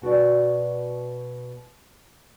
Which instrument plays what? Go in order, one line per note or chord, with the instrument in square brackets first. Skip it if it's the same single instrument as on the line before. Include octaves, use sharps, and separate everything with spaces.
[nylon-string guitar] B2 F#4 B4 D5